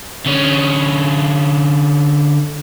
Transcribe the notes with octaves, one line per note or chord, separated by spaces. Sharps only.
D3 C#4